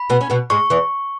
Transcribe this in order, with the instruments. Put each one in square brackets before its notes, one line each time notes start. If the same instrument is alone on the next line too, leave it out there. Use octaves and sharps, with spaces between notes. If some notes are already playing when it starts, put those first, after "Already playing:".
Already playing: [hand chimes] B5
[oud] B2 B3
C#4
B2 B3
[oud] G#2 G#3 [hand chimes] C#6
[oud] E2 E3